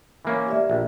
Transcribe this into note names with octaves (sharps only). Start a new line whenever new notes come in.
E3 A#3 C#4
G4 D5 E5
A#1